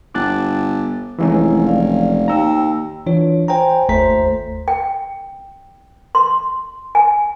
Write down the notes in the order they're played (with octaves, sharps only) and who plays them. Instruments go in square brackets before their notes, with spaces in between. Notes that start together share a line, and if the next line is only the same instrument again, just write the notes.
[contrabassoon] G1 [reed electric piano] D6 F#6 A6
[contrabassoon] F1 [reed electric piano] E3 G#3 C#4 [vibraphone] E4 A#5
[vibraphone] D5 F5
[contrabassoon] D#2 [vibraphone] G5 [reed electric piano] A#5 E6
[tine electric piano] E3 D4 F4 C#5
C5 G5 G#5 A#5
G1 D#2 A3 C5 A#5 B6
[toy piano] G5
C6
G#5